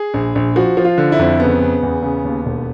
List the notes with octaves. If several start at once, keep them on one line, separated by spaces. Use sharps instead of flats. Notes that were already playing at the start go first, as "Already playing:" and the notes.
Already playing: G#4
A#1
A#1
F3 F#4
F3
F4
D3
E4
F2
C#3 B3
C#3
E2
C#3
D#2
E1